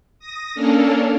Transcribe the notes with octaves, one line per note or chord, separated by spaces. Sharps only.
D#6 A#6
A#3 C#4 D4 A4 A#4